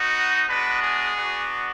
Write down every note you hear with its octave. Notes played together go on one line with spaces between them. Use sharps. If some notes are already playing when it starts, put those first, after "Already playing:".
Already playing: B3 D#4 F#4
G#3 B3 D4 F#4 B4
G#4
B3 D4 F#4